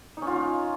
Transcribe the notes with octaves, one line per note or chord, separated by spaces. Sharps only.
C#4 D#4 F4